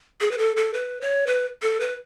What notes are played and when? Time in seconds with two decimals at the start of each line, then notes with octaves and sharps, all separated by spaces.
0.21 G#4
0.31 B4
0.38 A4
0.57 A4
0.74 B4
1.01 C#5
1.27 B4
1.62 A4
1.80 B4